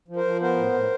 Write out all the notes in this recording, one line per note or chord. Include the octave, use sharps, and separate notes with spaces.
F3
A#4 C5
F3
B3 A#4 C5
A2
A2